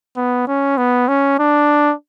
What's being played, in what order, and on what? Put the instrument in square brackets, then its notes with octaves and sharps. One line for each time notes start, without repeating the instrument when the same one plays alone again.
[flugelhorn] B3
C#4
B3
C#4
D4